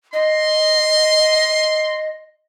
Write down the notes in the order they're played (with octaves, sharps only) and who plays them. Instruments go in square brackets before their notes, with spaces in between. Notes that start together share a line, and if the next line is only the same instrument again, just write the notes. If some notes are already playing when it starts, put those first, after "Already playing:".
[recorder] D#5 [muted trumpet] C6